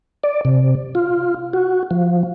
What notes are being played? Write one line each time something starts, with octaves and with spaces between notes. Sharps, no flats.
D5
C3
F4
F#4
F3